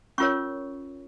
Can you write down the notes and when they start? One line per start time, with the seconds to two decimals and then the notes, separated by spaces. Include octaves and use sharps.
0.18 C#4 F4 A#4 C#5 C#6